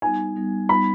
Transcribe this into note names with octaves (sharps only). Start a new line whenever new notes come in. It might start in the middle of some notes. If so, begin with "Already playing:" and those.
G3 B3 D#4 G#5
G3 B3 D#4
G3 B3 D#4 B5